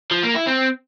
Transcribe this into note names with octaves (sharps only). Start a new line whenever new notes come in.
F3
A#3
E4
C4